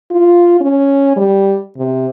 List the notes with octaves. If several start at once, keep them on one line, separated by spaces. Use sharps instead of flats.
F4
C#4
G3
C3